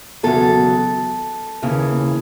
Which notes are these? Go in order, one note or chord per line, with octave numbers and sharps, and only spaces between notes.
E2 C#3 F#3 A4
D#2 C#3 E3